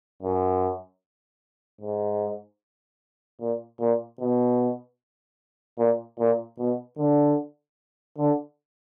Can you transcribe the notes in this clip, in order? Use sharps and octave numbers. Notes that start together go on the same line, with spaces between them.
F#2
G#2
A#2
A#2
B2
A#2
A#2
B2
D3
D3